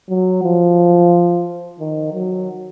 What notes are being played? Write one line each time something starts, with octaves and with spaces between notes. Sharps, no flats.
F#3
F3
D#3
F#3